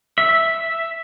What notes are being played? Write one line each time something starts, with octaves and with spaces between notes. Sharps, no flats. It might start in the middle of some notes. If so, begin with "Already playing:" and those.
E5